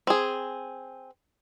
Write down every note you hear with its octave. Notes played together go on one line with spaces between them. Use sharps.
C4 G#4